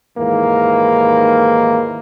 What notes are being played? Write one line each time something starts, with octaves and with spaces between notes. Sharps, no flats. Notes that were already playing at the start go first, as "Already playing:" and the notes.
D#2 G#2 D#3 E3 A#3